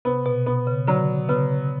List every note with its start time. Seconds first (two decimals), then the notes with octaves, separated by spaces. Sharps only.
0.05 C3 B3
0.26 B2
0.46 B2 B3
0.67 C#3
0.88 D3 F#3
1.29 C#3 B3